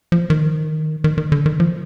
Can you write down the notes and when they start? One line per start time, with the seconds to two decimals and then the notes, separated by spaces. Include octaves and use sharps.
0.12 F3
0.30 D#3
1.04 D#3
1.18 D#3
1.32 D3
1.46 D#3
1.60 F3